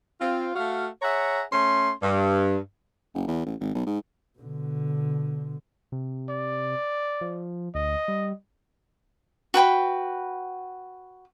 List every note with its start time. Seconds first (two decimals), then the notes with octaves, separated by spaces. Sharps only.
0.19 C4 F4
0.55 A3 F#4 F5
1.02 G#4 C#5 E5 F#5 A#5
1.52 A3 C#4 C6
2.01 G2
3.14 F#1
3.27 E2
3.46 A1
3.60 G#1
3.75 B1
3.86 G#2
4.39 B2 D3
5.92 C3
6.29 D5
7.21 F3
7.75 D2 D#5
8.08 G3
9.54 F#4 B4 G5 B5